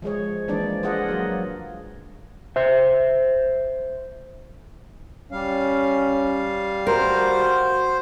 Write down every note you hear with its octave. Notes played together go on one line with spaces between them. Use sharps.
F3 G#3 G#4 C#5
E3 F3 G#3 A#3 D4 D5
F4 G#4 D5 D#5 F#5
F#3 A#3
C5 E5
G3 C#4 F5
F#4 A#4 C5